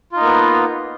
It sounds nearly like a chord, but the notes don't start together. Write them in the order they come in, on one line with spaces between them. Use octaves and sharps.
F4 D#4 A#3 B3